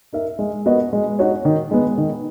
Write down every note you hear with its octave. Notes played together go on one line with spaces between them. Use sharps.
D#4 A#4 E5
G#3
B3 F#4 A#4 D#5
G#3
D#4 F#4 C#5
D#3
G#3 B3
D#3